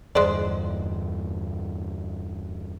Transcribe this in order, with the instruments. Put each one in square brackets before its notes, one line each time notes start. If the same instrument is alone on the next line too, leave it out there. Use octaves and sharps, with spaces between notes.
[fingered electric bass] E2 G2 D3 [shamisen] G#3 C5 D5